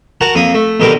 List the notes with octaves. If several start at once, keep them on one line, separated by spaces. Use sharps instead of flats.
F#4 A#4 F#5 A5 A#5
F2 A#3 D#6
A3
A#1 B2 D3 G4 A#4 D6